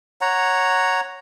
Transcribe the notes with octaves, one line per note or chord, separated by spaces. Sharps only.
C#5 F#5 A#5